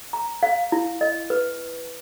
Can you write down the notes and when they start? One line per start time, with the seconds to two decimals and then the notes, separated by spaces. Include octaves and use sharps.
0.13 A#5
0.43 F5
0.72 E4
1.01 D#5
1.30 B4